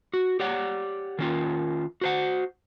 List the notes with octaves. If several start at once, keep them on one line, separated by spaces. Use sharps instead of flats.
F#4
G4 C#5 D5 F#5
D#3 C#4 F4
F#4 C5 F#5